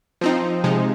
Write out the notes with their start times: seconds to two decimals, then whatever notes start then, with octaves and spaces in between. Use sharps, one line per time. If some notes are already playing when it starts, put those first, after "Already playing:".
0.21 F3 C4 D#4
0.64 C3 F3 G#3 D#4